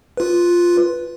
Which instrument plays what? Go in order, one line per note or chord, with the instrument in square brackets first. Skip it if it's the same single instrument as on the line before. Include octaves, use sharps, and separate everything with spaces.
[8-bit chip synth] F4 B4